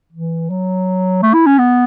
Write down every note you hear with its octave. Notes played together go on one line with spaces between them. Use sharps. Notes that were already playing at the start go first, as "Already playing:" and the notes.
E3
F#3
A3
E4
C#4
B3